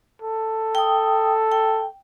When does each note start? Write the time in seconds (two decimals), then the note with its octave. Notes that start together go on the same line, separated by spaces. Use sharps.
0.22 A4
0.75 G5 D#6
1.52 G5